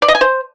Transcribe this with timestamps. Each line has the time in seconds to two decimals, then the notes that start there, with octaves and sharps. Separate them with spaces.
0.02 D5
0.08 D#5
0.15 G#5
0.21 C5